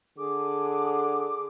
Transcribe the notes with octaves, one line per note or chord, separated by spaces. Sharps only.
D3 G#4 D6